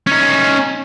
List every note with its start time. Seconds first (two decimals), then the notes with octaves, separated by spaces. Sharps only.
0.07 C#4 D#4